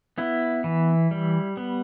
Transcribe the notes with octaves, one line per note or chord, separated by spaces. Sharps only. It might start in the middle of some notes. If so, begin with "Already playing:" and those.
B3 E4
E3
G3
B3